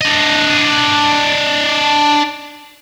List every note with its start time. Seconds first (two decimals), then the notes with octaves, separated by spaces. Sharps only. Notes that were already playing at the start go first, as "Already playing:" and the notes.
0.01 D4 D#5